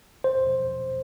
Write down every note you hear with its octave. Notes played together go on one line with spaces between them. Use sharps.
C5